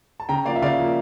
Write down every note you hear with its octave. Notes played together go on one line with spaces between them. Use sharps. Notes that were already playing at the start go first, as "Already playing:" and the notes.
A5
C#3 G5 A#5
F3 A#3 D5 F5
E5
C#3 D5 F5
F3 A#3